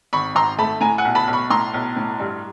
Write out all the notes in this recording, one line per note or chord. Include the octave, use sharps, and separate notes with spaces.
G#1 B5 C#6
G#1 A#5 C6
A3 A5 B5
A2 G#5 A#5
F#5 G#5
B1
A5 B5
B1
B5 C#6
A2 A#5 C6
B1
A2
G2